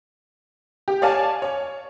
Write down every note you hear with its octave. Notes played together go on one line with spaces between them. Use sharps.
G4
C#5 D5 F5 G#5 A5
C#5